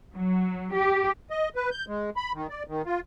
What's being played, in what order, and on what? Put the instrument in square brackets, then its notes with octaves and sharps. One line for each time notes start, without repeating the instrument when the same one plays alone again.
[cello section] F#3
G4
[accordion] D#5
B4
G6
G#3
B5
D#3
D5
D#3
F4